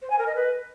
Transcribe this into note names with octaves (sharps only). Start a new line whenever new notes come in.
C5
G#5
A#4
D#5
B4